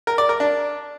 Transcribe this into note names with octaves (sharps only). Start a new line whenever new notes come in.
A#4
D5
A#4
D4